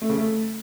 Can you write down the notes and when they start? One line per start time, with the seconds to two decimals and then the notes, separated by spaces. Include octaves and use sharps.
0.02 A3
0.10 C#3
0.18 A3